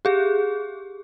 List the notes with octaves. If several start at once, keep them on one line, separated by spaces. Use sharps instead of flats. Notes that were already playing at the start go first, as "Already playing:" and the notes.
G4 G#4